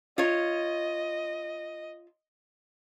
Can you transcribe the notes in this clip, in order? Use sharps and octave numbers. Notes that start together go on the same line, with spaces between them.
F4 C#5 D#5